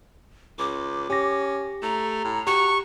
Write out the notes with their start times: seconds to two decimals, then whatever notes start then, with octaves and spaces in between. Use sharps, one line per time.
0.59 C#2 D6
1.10 C#4 G4 A#6
1.83 A3 A#5
2.25 A2
2.47 F#4 G4 C#6